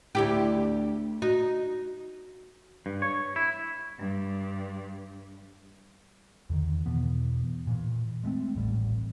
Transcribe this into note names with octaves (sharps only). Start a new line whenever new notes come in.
D2 E4 G4
D#4 F#4
G2
C#5
E4
G2
E2 D3 D#3
E2 B2 E3 B3
A#2 E3
G#3 A3 B3 C4
D#1 A1 G3